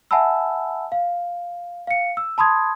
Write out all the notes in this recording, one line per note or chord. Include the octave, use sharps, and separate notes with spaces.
E5 F#5 G#5 A5 B5 E6
F5
F5 C#7
E6
A5 B5 C6 D#6 G#6